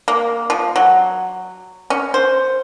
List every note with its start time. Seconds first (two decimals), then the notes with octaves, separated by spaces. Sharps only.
0.08 A#3
0.50 F3
0.76 F#3
1.90 C#4
2.14 C5